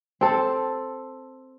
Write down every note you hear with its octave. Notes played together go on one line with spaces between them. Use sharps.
C4 A4